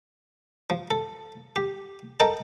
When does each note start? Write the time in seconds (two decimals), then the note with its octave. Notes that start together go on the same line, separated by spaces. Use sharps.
0.70 F3
0.91 A4
1.56 G4
2.20 A4 A#4 D#5 G5 A5